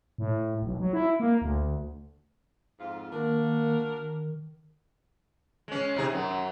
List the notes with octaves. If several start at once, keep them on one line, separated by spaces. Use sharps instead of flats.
A2
B1
F#3
E4
A#3
D2
F2 G#2 F4
D#3 A#3 D4 F#4 A#4
D#3
G#3 C#4
C3 D#4 G#4
F#2 F#3